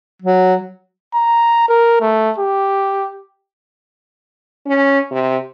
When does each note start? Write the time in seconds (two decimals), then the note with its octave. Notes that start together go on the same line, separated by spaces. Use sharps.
0.22 F#3
1.15 A#5
1.69 A#4
2.01 A3
2.38 G4
4.66 C#4
5.11 C3